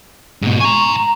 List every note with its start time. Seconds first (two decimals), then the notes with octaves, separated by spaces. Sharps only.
0.42 G#2 B2
0.60 G#5 A#5 C#6
0.97 A#5